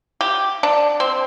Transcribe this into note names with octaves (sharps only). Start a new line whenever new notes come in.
G4
D4
C4